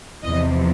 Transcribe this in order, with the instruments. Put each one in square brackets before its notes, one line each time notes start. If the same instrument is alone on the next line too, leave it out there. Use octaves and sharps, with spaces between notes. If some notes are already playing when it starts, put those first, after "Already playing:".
[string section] E2 C3 F3 D#5